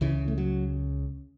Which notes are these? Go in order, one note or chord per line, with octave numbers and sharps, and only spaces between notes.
C#2 C#3 E3
A3
F#3